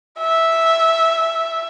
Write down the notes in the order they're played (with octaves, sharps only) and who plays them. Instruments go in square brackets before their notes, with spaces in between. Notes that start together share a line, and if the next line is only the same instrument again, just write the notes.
[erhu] E5